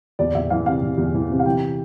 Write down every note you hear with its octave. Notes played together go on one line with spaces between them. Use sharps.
E2 D5
E2 E5
E3 F5
C3 F5
E3
E2
E3
C3
F5
E3 G5